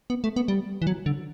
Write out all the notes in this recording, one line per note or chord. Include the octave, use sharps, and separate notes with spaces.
B3
A3
B3
G3
E3
F#3
D3